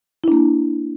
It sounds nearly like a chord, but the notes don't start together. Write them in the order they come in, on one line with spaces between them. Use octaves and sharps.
E4 D4 A#3